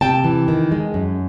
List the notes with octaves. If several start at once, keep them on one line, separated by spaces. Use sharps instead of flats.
C3 G5 A5
E3
D#3
G#3
F#2